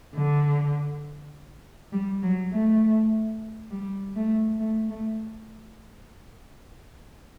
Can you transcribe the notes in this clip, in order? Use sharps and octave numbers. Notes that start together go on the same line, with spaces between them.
D3
G3
F#3
A3
G3
A3
A3
A3